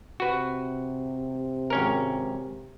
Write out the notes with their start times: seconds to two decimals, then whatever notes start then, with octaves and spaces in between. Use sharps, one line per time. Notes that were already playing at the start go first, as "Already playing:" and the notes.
0.20 C3 F#4 B4
1.70 G#1 C#4 A#4